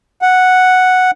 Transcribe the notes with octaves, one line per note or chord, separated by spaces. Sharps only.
F#5